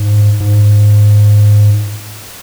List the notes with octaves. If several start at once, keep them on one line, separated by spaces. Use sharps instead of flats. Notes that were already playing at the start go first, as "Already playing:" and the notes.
Already playing: G#2
G#2